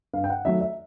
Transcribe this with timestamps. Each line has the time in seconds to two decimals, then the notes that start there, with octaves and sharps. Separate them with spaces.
0.13 G2 F5
0.24 G5
0.30 F#5
0.45 D#3 F#3 A3 E5
0.61 E5